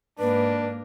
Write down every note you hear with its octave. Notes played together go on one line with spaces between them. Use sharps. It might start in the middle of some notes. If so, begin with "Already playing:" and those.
G#2 A#3 D4 B4